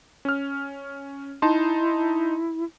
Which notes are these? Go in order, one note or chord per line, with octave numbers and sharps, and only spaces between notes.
C#4 F6
D#4 E4 A5 C6